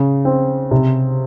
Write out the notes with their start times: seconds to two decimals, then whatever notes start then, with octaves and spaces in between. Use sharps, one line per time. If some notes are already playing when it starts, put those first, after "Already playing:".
Already playing: C#3
0.25 C4
0.71 C3